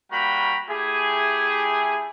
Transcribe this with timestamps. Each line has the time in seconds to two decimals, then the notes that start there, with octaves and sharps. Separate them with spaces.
0.11 G3 A#3 F#4 G5 A#5 B5
0.69 A3 E4 G4 G#4